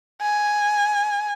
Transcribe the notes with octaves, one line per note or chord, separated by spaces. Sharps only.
G#5